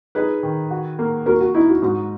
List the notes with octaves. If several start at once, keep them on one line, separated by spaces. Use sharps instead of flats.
D#4 G#4 B4
D#3
F#4
A#3
A#3 F#4 A#4
F#4
D#4 E4
F#4
G#2 F#4